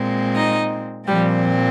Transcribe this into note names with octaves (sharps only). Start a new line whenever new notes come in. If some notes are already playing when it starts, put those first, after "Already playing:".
Already playing: A#2 G#3 C4
D#4 D#5
A#2 F3 G3 C4 G4